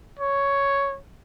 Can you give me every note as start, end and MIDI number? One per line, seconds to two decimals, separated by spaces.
0.19 0.98 73